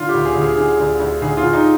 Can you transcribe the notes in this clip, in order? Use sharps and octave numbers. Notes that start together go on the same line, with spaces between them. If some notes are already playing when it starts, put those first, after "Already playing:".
Already playing: D3 F4
G4
D2
G#4
D2
G#4
D3 G#4
D2
D2
D2 G#4
F4
D2
D#4